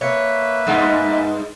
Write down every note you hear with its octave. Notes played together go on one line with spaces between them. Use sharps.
A#3 B4 C#5 E5
G2 G#3 B3 D#4